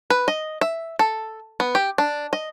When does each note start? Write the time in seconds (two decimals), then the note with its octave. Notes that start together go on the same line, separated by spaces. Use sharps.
0.10 B4
0.28 D#5
0.61 E5
0.99 A4
1.60 B3
1.75 G4
1.98 D4
2.33 D#5